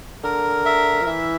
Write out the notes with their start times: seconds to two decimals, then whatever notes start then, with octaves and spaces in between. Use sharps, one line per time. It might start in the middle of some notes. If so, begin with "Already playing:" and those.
0.24 D3 A#4
0.65 E5
1.01 F3
1.07 E3 E5